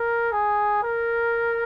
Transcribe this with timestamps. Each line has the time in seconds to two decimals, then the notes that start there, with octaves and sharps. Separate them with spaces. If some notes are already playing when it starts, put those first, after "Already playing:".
Already playing: A#4
0.32 G#4
0.83 A#4